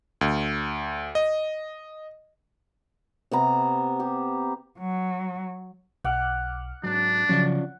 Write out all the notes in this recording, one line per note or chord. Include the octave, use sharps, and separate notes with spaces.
D2
D#5
C3 B3 A#5
G4
F#3
B1 F#5 D6 F6
G#2 F#3 D4 F#6
C#3 F3 F#3 C#4 F4 D5